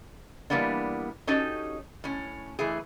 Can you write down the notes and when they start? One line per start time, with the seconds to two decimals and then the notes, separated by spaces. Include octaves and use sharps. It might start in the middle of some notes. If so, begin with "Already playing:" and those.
0.50 E3 G3 A#3 B3 D4
1.27 C#4 D#4 F#4 G4 A4 D#5
2.04 A2 C#4
2.59 E3 A3 G#4